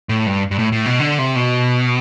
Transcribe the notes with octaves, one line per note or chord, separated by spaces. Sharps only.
A2
G2
G2
A2
A2
B2
D3
C3
B2